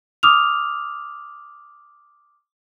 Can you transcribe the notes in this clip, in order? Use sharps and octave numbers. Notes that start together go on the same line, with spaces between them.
D6 D#6 F6 F7